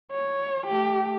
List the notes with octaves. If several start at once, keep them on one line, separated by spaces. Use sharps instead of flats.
C#5
A3 G4